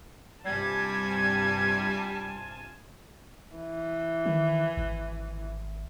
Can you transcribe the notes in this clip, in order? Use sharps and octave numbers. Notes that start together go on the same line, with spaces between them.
G2 C3 G3 F4 G#5 A5 G#6
E3
D#3
G#1